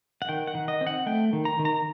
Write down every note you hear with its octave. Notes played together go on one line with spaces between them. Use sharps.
F#5
D#3 G5
F#5
D#3
D#5
C4
F#5
A3 G5
D#3
A#5
D#3
A#5